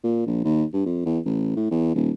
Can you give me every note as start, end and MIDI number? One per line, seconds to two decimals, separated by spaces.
0.04 0.25 46
0.26 0.44 34
0.44 0.64 39
0.73 0.85 43
0.86 1.05 41
1.06 1.19 40
1.26 1.55 33
1.56 1.68 45
1.71 1.94 40
1.95 2.10 27